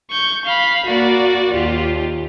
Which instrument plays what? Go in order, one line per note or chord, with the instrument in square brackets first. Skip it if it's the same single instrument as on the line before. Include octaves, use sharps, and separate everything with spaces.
[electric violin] C#6 G6
F5 B5
[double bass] A#3 [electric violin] F#4 D5
[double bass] D#2 [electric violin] F4 G4